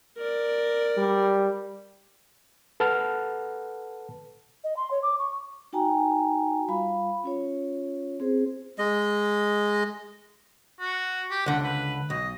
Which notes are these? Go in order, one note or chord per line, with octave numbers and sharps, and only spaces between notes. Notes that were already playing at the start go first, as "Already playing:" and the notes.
A#4 D5
G3
A4 B4 F#5 A5 F6
D#5
C6
C#5
D6
C#6
D#4 F#4 G5 G#5 A#5
G3 F4 F5 B5
C#4 F4 C#5
C4 G#4 C5
G#3 D#5
F#4
G4
C#2 D3 F#5
B4
B1 D#5